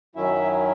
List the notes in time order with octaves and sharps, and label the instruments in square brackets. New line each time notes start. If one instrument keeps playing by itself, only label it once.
[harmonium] F#2 D#3 F#3 C#4 E4 E5